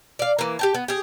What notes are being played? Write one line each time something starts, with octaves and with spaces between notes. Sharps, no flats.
D5 F5
E3 A#3
G4 G5 A5
B3
G4 G#4